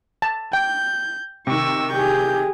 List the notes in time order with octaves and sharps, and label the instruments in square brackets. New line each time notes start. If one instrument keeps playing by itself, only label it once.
[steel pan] A5
[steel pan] G5 [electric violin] G6
[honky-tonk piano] C3 D#3 [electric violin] C#6 E6
[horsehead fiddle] G4 G#4 [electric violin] G6